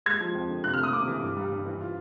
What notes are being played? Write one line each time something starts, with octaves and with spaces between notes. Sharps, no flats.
G#3 G#6
F3
F2
D3
C3 F#6
A3 F6
D#6
C3 D6
E3
G2
G3
G2
E3
F4